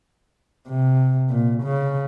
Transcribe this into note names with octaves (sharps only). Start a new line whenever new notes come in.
C3
A#2
C#3